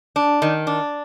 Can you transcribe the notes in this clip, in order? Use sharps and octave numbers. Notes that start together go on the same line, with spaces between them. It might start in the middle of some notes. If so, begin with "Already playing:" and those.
D4
D#3
D4